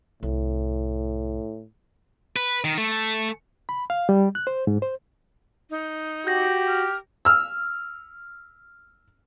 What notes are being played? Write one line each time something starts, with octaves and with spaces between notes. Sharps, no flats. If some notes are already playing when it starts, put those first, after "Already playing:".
C2 A2
B4
D#3
A3
B5
F5
G3
F#6
C5
G#2
C5
D#4
F#4 G4 G6 A#6
F6
E6 F6